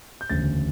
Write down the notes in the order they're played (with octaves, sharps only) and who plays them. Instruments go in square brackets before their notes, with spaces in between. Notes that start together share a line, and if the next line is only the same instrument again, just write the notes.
[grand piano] G6
E1 D2 C#3 A6